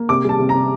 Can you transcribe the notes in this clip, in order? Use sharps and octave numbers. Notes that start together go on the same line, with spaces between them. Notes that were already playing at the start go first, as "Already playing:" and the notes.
Already playing: A#3
C3 D6
G3 A5
C3
A#5
C3